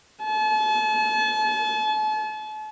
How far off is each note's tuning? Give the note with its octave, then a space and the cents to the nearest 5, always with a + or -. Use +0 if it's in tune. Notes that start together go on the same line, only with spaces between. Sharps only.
A5 -40